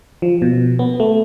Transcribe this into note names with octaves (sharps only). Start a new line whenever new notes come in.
F3
B2
B3
A3